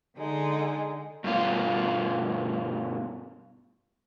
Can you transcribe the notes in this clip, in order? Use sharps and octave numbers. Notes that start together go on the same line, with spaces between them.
D3 G#3 D#4
G2 B2 F4